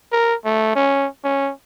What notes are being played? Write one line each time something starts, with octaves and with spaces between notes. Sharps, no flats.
A#4
A3
C#4
C#4